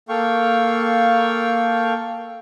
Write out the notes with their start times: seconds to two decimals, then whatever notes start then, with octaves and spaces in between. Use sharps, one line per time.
0.09 A#3 A4 F5 G5 C#6